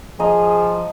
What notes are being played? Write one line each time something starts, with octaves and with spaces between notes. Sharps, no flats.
F3 G#4 D#5 A#5